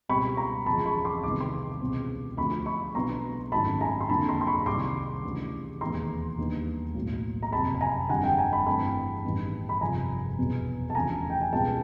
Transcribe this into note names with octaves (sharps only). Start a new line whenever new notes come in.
C#2 B2 G3 C4 B5 C#6
A#5 C6
E1 E2 C#3 F3 G#3 A5 B5
B5 C#6
C6 D6
C2 C3 D#3 G#3 B3 D6
C6 D6
C#2 B2 G#3 C4
D2 D3 F3 B5 C#6
B5 C#6
B1 B2 F#3 B3 D4 A#5 C6
G#1 F#2 D#3 F#3 A3 A5 B5
G#5 A#5
C6
F2 D3 F#3 A#3 D4 A5 B5
A#5 C6
C6
B5 C#6
C2 C3 D#3 C6 D6
D2 C#3 E3
E1 D#2 D#3 G#3 B3 A#5 C6
D#2 D#3 G3 B3 D4
B1 A2 F#3 A#3
A#5
F#1 F2 C3 A5 B5
A5
G#5 A#5
G1 F2 D3 G3 F#5 G#5
G5 A5
G#5 A#5
A5 B5
G2 E3 A3 C4 A5 B5
A1 G2 D#3 G3 B3
B5
G1 F2 C3 F3 G#5 A#5
E2 B2 F#3
A5
E1 D2 C#3 F3 A3 G#5 A#5
G5
G#5
C#2 B2 G3 G5 A5